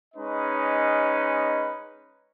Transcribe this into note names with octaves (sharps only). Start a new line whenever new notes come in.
G#3 C#4 D#4 B4 D#5